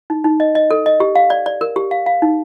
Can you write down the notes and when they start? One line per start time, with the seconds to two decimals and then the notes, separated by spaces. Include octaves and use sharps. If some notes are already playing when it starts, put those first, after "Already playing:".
0.10 D#4
0.24 D#4
0.40 D#5
0.55 D#5
0.71 A4
0.86 D#5
1.00 G4
1.15 F5
1.30 D5
1.46 D5
1.61 A#4
1.76 G4
1.91 F5
2.06 F5
2.22 D#4